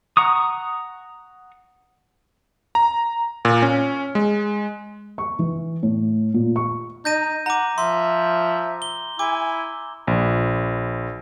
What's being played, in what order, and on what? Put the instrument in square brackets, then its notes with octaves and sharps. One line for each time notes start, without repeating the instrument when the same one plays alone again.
[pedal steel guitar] F#5 A#5 C#6 D#6
[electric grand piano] A#5
A#2
C#4
G#3
[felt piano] C#6
E3
A2
A#2
C#6
[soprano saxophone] D#4 [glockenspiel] G6 A#6 D#7
[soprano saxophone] F#5 [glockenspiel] A#5 D6
[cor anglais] F3 [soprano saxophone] E5 [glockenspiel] C6
[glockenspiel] G7
[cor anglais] E4 [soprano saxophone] G#5 [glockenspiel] D6
[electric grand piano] A#1